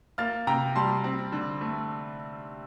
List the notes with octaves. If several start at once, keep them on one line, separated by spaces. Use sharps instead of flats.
A#3 F6 A6
C3 G5 A#5
G3 A5 C6
C4
D3
A3